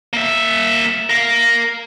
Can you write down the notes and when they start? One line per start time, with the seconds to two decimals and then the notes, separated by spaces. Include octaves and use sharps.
0.13 A#3 E5
1.10 A#4 F5